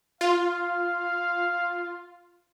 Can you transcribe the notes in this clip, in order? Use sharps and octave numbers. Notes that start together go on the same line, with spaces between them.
F4 F5